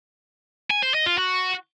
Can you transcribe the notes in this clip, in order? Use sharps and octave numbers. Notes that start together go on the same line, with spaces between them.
G#5
C5
D#5
F4
F#4